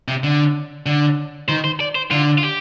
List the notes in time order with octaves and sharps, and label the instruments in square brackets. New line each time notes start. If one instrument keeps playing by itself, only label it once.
[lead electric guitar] C3
D3
D3
[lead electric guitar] D#3 [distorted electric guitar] C5
[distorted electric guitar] C5
D5
C5
[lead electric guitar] D3 [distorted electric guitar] F4
[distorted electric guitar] F4
G4